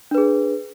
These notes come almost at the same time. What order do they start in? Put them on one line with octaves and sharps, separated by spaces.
D4 B4 G#4